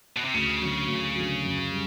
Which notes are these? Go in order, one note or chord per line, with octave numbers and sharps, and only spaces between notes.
B2
C3
D2 C#3
D3 F#3
D2
D3 F#3
F#2
G3